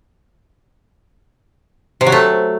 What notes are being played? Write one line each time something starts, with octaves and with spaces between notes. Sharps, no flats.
C3
F#3
A3